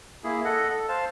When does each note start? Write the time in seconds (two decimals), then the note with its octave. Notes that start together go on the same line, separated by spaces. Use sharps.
0.24 A#3 E4 G#4
0.44 A4 D#5 F#5
0.69 A4
0.89 C5 F5 A5